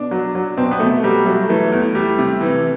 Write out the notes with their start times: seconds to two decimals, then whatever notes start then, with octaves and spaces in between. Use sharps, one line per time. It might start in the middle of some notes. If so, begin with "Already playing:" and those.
Already playing: B2 D4
0.11 F#3
0.35 F#3
0.57 B2 C4
0.71 B3
0.80 B2 A3
1.03 F#3 G3
1.26 F#3 A3
1.49 E3 A3
1.72 E2
1.95 G3
2.19 C3
2.41 E3